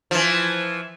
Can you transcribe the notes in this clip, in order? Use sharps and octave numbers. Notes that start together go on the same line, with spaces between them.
E3 F3